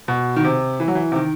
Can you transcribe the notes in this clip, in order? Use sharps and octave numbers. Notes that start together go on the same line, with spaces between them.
B2
D#3
C3
E3
F#3
E3
C3
D#3